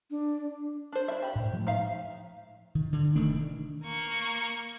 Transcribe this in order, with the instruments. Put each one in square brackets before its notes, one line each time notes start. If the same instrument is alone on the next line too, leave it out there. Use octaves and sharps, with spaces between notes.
[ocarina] D4
[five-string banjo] D4 C5
D4 E4 E5
G4 B5
[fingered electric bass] A2
F3 G#3 A3
[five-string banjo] D#4 E5 F5
[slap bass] D#3
D3
E1 D#3 A3 D4
[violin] A#3 C#6